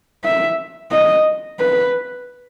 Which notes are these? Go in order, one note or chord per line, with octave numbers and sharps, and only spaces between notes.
E5
D#5
B4